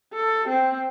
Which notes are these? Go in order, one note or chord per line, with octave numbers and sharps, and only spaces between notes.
A4
C4